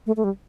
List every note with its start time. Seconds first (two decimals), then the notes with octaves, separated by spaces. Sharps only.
0.06 A3
0.17 A3
0.24 G3